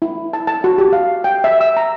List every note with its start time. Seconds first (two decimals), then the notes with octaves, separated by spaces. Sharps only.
0.02 E4
0.33 A5
0.47 A5
0.64 F#4
0.78 G4
0.93 F5
1.24 G5
1.44 E5
1.61 E6
1.77 A#5